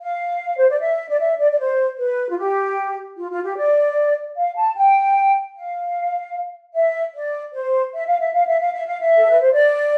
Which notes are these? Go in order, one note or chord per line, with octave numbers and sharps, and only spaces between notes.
F5
C5
D5
E5
D5
E5
D5
D5
C5
B4
F4
G4
F4
F4
G4
D5
F5
A5
G5
F5
E5
D5
C5
E5
F5
E5
F5
E5
F5
E5
F5
E5
A4
B4
C5
D5